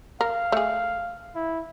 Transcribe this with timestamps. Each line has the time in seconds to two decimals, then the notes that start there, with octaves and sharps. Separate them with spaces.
0.21 A#4 F5
0.52 A3 G#4
1.35 E4